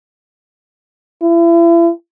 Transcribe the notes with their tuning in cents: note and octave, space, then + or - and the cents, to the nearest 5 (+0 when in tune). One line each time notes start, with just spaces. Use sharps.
E4 +40